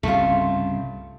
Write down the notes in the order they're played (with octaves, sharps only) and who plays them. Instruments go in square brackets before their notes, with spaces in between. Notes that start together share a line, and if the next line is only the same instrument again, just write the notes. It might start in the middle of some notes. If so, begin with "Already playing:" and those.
[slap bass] C2 G2 C#3 [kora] A3 F4